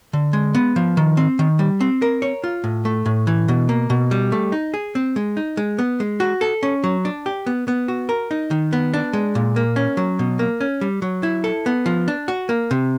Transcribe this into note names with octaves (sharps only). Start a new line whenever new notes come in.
D3
G#3
B3
F3
D#3
C4
D#3
G3
C4
A#4
C#5
F4
A2
A3
A2
E3
B2
A#3
B2
G3
A3
D#4
G#4
C4
G#3
D#4
G#3
B3
G#3
F#4
A4
C#4
F#3
D4
G4
B3
B3
F#4
A#4
D#4
D#3
B3
D4
G#3
A#2
A#3
C#4
F#3
B2
A#3
C#4
G3
F#3
E4
A4
B3
F3
D4
F#4
A#3
C3